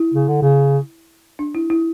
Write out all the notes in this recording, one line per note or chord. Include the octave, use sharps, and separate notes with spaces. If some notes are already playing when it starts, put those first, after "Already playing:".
Already playing: E4
C#3
D3
C#3
D4
E4
E4